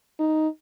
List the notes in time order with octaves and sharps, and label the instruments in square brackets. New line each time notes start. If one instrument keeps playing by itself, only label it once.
[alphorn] D#4